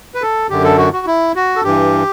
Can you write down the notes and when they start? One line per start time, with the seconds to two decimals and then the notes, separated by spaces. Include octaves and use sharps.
0.15 B4
0.22 A4
0.50 F#2 D3 G4
0.64 A4
0.78 F#4
0.93 F#4
1.07 E4
1.36 F#4
1.56 A4
1.63 G2 E3 G4